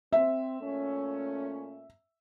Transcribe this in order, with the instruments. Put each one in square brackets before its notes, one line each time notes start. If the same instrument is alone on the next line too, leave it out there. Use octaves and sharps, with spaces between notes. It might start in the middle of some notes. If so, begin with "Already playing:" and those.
[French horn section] C4 [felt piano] E5
[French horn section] A#2 A3 C#4